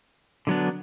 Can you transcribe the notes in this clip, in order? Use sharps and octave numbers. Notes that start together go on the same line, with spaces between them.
D3 F#3 B3 D4